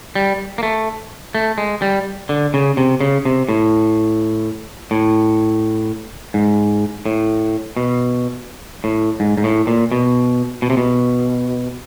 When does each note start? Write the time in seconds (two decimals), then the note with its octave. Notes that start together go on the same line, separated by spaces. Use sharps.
0.15 G3
0.58 A#3
0.63 A3
1.35 A3
1.58 G#3
1.82 G3
2.29 D3
2.54 C#3
2.77 C3
3.01 C#3
3.25 C3
3.49 A2
4.91 A2
6.34 G#2
7.06 A2
7.77 B2
8.84 A2
9.20 G#2
9.38 G#2
9.44 A2
9.67 A#2
9.92 B2
10.62 B2
10.70 C3
10.77 B2